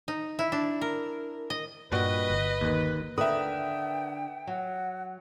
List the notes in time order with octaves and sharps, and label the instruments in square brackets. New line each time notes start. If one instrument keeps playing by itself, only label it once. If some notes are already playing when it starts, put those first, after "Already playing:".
[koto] D#4
E4
D4
A#4
D#5
[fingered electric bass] G2 [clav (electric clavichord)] A#2 G3 F#4 [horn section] B4 [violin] D#5
[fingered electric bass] G1
[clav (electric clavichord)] D#2 D#3
[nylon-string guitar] D3 A#4 B4 [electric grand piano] E5 D#6 [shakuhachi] G5
[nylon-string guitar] F#3 [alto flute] F#5